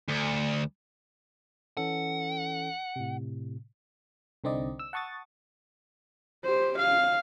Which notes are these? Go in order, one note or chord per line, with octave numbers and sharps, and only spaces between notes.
D2
E3 C#4 A4 F#5
A2 C3
C2 D3 C4 D#4 D5 D#5
E6
F#5 A5 C#6 D#6 A6
G4 C5
F5